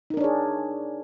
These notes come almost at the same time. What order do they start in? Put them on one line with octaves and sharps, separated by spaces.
D#4 A#4 D4 C#5 G#4